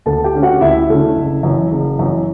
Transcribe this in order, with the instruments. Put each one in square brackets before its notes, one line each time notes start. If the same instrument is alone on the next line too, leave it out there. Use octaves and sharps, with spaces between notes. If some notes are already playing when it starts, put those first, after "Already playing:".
[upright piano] D2 A4 A5
G4 G5
D3 A3 C#4
F#4 F#5
D2 E4 E5
D3 A3 C#4
F#1
F#2 E3
F#1
F#2 E3